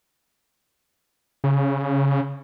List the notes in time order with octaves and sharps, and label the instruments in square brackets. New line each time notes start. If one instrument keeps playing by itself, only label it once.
[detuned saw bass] C#3